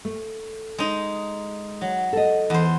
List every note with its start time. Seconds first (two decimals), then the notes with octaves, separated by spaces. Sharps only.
0.05 A3
0.78 G#3 D#4
1.81 F#3
2.13 A4 D#5
2.50 E2 C5